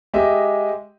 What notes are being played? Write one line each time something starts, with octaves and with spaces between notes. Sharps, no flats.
G#3 G4 D#5 E5